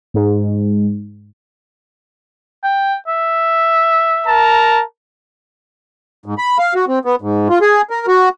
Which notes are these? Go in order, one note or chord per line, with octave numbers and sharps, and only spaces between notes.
G#2
G5
E5
A#4 A5 A#5
G#2
B5
F5
F#4
C4
B3
G#2
F4
G#4
A#4
F#4